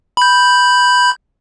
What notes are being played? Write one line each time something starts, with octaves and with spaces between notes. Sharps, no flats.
B5 G6